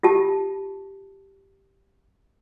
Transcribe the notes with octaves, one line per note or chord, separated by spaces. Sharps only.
F4 G4 A5